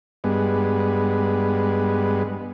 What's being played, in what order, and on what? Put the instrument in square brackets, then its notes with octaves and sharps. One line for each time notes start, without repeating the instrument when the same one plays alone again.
[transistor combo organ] G2 G#3 B3